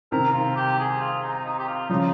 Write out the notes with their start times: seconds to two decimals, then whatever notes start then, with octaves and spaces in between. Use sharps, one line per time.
0.12 C3 D#3 A#4
0.33 F4
0.56 G4
0.79 G#4
1.01 F4
1.22 D#4
1.45 D#4
1.59 G4
1.67 F4
1.89 C#3 F3 D#4